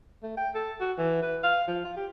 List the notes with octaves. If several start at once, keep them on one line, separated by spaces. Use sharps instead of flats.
A3
G5
A4
F#4
E3
B4
F5
F3
F4
G4